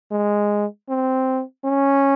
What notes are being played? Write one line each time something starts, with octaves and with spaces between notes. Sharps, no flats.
G#3
C4
C#4